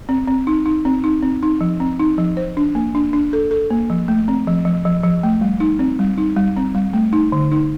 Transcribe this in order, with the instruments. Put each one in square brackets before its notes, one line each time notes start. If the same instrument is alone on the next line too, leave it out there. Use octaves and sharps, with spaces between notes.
[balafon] C4
C4
D#4
D#4
C4
D#4
C4
D#4
F3
C4
D#4
F3
C5
D4
A#3
D4
D4
A4
A4
A#3
F3
A3
C4
F3
F3
F3
F3
A3
G3
D#4
C4
G3
D#4
G3
C4
G3
A3
D#4
D3
D#4